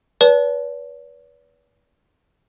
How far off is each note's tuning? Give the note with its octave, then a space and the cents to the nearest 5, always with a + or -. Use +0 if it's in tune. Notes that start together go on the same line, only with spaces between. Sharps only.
B4 -20 D5 -45 A5 -10